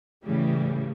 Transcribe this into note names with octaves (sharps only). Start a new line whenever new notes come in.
A2 C#3 E3 G3